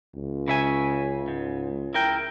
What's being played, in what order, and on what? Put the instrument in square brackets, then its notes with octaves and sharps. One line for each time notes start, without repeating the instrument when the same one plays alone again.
[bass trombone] C#2
[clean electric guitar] C#3 E5 G#5
G#2
E4 A#4 G5